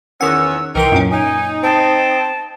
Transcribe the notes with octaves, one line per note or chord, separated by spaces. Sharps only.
E2 D#3 C#4 F#5 E6
C2 E3 D#4 A#4 G5 C6
F#2 A#2 C#4
D#4 G#5
C4 A5